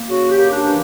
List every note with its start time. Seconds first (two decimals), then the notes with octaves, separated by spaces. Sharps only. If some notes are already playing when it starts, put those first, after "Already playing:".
Already playing: A#3
0.08 C#3 F#4
0.30 G4
0.37 A#3
0.52 D4
0.66 E3